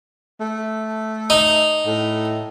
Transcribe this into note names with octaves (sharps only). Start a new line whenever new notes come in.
A3
D#4
A2